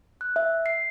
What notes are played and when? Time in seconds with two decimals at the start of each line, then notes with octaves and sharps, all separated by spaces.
0.21 F#6
0.36 E5
0.66 C7